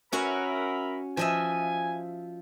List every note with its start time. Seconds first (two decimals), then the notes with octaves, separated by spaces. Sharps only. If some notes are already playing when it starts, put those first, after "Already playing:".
0.12 C#4 F#4 A#4 E5 F#5 B5
1.17 F3 D#5 E5 G#5